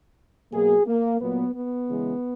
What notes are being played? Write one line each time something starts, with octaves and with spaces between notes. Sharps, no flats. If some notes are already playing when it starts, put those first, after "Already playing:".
B2 F#3 A#3 G#4
A#3
A#2 F#3 A#3 B3
B3
C#3 E3 G#3